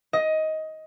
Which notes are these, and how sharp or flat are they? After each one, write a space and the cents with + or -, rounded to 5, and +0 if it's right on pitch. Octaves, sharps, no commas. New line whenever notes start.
D#5 +15